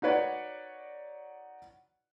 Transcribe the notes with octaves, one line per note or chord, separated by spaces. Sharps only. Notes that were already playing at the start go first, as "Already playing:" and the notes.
D#4 F#4 B4 C#5 D5